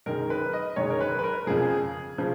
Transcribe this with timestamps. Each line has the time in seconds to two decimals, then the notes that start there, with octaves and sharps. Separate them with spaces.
0.06 F#2 D#3 G#3 A#4
0.30 B4
0.53 D#5
0.76 F#2 D#3 G#3 C#5
0.90 A#4
1.01 B4
1.19 B4
1.24 A#4
1.47 F2 C#3 F3 G#4
2.18 C#3 F3